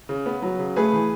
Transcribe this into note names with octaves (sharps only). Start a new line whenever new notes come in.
C#3
B3
F#3
C#3
A3 G#4 B4
E3